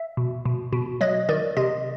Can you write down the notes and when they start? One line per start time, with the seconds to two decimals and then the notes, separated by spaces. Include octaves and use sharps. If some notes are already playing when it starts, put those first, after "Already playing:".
Already playing: E5
0.17 B2
0.46 B2
0.73 B2
1.01 F#3 D#5
1.29 D#3 D5
1.57 C3 D#5